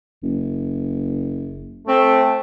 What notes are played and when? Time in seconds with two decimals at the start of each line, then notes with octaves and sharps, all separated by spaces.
0.23 F#1
1.87 A3 C4